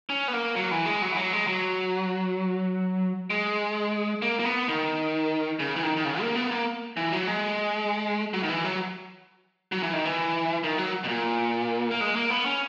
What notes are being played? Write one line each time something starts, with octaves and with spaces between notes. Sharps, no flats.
C#4
B3
A#3
F#3
E3
G#3
F#3
E3
F#3
G#3
F#3
G#3
A#3
A#3
B3
D#3
C#3
E3
D#3
D#3
C#3
A#3
B3
A#3
E3
F#3
G#3
F#3
D#3
E3
F#3
F#3
E3
D#3
E3
D#3
F#3
B2
A#2
A#3
G#3
A#3
B3
C#4